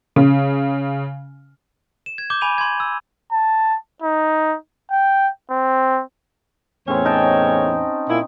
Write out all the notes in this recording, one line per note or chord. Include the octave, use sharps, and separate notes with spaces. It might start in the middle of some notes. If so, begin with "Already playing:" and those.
C#3
E7
G#6
D6 G6 G7
G#5 B5 D6 D#7 F7
C6 G#6
E6
A5
D#4
G5
C4
E2 A2 C4 C#4 C#5
D#4 G5 A5
A#2 E4